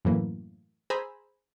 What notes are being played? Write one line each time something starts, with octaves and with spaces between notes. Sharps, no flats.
F#2 A2 E3 A#3
G#4 C5 G#5 A#5 B5 E6